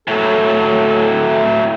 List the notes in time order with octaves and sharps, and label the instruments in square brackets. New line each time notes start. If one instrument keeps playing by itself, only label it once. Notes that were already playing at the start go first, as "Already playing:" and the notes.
[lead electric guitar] A2 F#3 [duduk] A4